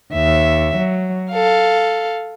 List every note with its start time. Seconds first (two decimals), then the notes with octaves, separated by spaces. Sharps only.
0.13 D#2 E5
0.75 F#3
1.31 A4 F5